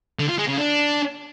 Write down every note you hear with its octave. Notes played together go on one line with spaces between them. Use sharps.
D3
F4
G#3
C#3
D4